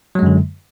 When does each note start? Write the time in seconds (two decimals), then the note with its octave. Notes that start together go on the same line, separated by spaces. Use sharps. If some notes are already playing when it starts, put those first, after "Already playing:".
0.15 F#3
0.19 G#3
0.23 F#2
0.26 D3